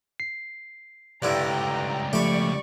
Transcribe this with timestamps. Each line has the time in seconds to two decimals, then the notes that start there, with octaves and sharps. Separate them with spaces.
0.20 C7
1.22 C#2 G2 D3 G3 E4 G5 A#5
2.13 F3 A3 G4 D5 B5 C#6